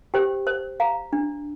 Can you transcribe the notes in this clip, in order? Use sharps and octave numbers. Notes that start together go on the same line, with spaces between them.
G4 C5 G5
C5
F5 A#5
D4